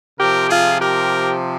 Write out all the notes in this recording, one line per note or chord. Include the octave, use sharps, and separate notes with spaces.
C3 F3 G4 A#4
F4 G#4
G4 A#4